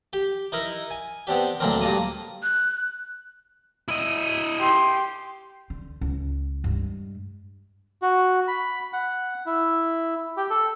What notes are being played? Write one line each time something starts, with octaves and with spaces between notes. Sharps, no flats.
G4
D#4 E4 A#4
G#5
B3 C4 D4 G4
D2 A#2 F#3 C4 D4 A#4
G2 A#3 D4 A#5 D#6
F#6
E4 D#5
G4 C6
D3
C#2
G2 G#3
F#4
B5
F#5
E4
G4
A4